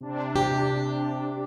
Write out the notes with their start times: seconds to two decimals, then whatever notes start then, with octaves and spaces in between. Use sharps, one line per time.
0.01 C3 D4
0.36 G4